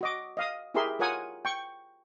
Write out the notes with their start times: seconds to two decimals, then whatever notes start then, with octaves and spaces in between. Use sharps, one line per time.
0.01 F#4 D#5 D6
0.37 D#5 F5 D#6
0.74 E4 G4 G#4 A#4 E5 C6
0.99 F4 A#4 C#5 F#5 G#5 D#6
1.45 G5 C#6